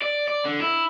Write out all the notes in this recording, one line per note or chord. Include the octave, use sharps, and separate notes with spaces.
D5
D5
D3
E4